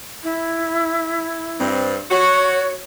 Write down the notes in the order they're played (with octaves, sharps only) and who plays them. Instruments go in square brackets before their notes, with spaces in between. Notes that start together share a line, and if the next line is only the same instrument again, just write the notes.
[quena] E4
[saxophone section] G2 C4
[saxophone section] F#4 [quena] C#5